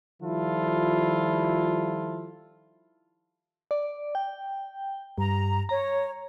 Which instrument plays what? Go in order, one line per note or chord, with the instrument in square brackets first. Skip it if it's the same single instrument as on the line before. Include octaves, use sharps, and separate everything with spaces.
[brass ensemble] D#3 F3 G3 E4 F4 A4
[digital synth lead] D5
G5
[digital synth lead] G2 [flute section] A#5
[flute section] C#5 [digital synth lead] A#5